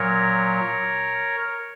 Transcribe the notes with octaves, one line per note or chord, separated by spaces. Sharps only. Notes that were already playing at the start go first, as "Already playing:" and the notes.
Already playing: A#2 F#3 A#4 C#5